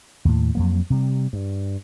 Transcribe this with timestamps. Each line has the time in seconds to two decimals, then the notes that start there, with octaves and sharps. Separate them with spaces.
0.25 D#2 A2
0.55 F2 F#3 A#3
0.90 C3 G3
1.33 G2